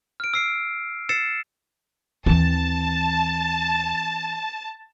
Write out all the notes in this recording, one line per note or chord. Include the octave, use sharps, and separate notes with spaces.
F6 D7
E6 C7 D7
E6 A6 C7 C#7 E7
D#2 E3 C4 A5